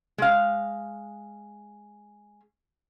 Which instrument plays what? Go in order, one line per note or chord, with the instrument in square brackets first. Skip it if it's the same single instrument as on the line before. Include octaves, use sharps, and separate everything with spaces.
[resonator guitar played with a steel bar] G#3 F5